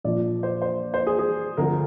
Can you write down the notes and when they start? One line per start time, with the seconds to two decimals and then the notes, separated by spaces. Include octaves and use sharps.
0.04 A#1 A#2 F3 D5
0.43 C5
0.62 C5
0.94 C5
1.07 G#4
1.19 G#4
1.57 D2 D3 F3 A#4